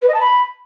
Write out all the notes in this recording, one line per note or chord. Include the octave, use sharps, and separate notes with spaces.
B4
D#5
A5
B5